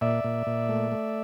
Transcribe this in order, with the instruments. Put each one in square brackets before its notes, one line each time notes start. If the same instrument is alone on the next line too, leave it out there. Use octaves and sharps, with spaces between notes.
[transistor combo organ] A#2 D5 E5
A#2
A#2
A3
A3